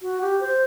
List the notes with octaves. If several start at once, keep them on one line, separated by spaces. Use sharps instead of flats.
F#4
G4
C5